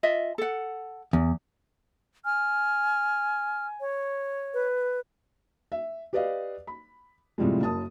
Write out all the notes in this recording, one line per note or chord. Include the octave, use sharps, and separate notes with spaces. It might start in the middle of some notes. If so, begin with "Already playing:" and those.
F4 D#5 E5
A4 F#5
E2
G#5 F6
C#5
B4
E5
G4 B4 D5 D#5 F5
B5
A2 C3 F3 G3 G#3
F#1 F#2 A5 D#6